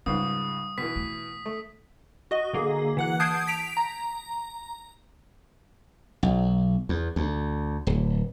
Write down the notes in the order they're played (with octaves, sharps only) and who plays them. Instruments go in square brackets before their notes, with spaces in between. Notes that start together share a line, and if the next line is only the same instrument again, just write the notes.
[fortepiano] C#2 G#2 [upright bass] G3 [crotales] D#6
[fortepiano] B2 E3 [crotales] B6
[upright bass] A3
[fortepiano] A3
[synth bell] F#4 D#5
D3 A#3 G#4
E3 F#5 F#6
A5 D#6 G6 G#6 C7 D7
B6 D7 F7
A#5
[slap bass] B1
E2
D2
D1